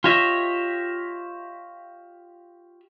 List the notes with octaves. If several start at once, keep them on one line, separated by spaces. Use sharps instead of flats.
F4 G4 C#5 D#5 E5